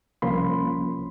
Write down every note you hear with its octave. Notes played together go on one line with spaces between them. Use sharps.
C2 F3 A#3 C#4 B5 C6